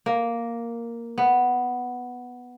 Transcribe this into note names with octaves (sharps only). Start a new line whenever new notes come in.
A#3
B3